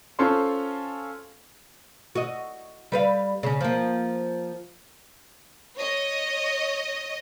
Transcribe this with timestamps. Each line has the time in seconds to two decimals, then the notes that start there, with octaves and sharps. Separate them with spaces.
0.19 C#4 F4 A4 C5 C6
2.15 F#4 D#5
2.92 G3 B4 F5
3.43 C#3 C#4
3.61 F3 A#3
5.76 C#5 D#5